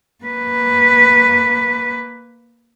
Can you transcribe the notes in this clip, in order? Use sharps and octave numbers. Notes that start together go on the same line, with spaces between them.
A#3 B4